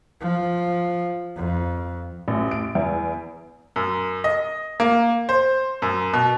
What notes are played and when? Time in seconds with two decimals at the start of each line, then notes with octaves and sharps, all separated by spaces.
0.20 F3
1.36 F2
2.28 A1
2.51 D7
2.75 E2
3.76 F#2
4.24 D#5
4.80 A#3
5.29 C5
5.82 F#2
6.13 B2